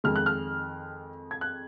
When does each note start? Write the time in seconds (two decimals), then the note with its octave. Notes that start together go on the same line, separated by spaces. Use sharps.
0.04 F2 D#3 G#3 F6
0.16 F#6
0.26 F6
1.31 G#6
1.41 F#6